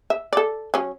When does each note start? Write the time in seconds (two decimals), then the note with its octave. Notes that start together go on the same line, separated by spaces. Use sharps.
0.10 E5
0.33 A4 D5
0.74 F#3 C#4